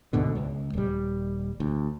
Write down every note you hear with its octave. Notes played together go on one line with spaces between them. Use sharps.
D2 G#2 B2 D3
C#2
D#1 G3
D2